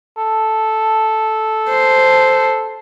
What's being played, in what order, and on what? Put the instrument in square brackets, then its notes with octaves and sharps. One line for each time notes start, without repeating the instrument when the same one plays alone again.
[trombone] A4
[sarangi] C5